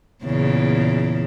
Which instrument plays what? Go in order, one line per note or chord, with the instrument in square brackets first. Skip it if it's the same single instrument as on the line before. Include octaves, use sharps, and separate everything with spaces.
[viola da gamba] E2 A#2 C#3